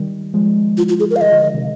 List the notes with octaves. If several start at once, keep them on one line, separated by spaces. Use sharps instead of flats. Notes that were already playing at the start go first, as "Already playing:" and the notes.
Already playing: D#3 G3
F3 G#3
F4
F4
G#4
A#4
F5
D#3 G3 D#5
D3 F3
D3 F3
C3 D#3